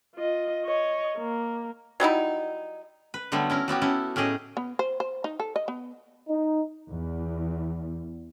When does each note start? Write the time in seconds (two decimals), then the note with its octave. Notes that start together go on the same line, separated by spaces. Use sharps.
0.15 F4 D#5
0.65 C#5 D#5
1.18 A#3
2.00 F#3 G3 D#4 E4
3.14 B4
3.32 D3 F#3 G3 A3 B3
3.50 C#4 E4 A#4
3.68 F#3 B3 F#4 G4
3.82 C#4 E4 A4
4.16 A2 C#4 G4 G#4 D#5
4.57 B3
4.79 C5
5.00 C5
5.24 D#4
5.40 A4
5.56 D#5
5.68 B3
6.28 D#4
6.90 E2